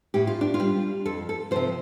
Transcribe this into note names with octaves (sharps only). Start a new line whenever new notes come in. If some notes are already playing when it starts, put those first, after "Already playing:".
A2 G4
F4
D4
F4
G3
F2 A4
A4
C3 F3 C5